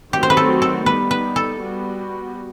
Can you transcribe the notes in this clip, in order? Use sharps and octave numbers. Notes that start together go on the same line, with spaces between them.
D#3 F#3 A3 C4 F#4 G4
C5
B4
A4
A4
G3 B3 D#4 B4
B4
A4
G3 B3 F#4